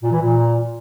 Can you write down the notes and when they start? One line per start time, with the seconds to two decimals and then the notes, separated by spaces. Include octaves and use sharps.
0.02 A#2
0.11 E3
0.20 A#2